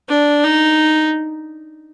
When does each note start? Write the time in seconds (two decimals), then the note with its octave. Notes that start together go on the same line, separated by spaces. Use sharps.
0.09 D4
0.44 D#4